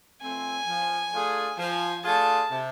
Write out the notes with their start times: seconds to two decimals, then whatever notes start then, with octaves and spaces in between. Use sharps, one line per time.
0.21 F3 A3 C4 G#5
0.68 F3
1.13 A3 D4 F4 G#4
1.58 F3 G#5
2.05 A3 D4 F4 G#4 A5
2.51 C3